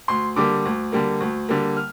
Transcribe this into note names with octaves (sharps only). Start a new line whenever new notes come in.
D2 C6
D3 G3 A#3 D6
D2
D3 G3 A#3
D2
D3 G3 A#3
F6